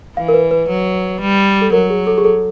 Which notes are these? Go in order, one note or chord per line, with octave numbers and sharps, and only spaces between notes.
E3 F5
A#4
B4
B4
F#3
G3
A4
F#3 A#4
G#4
A4
G#4
A4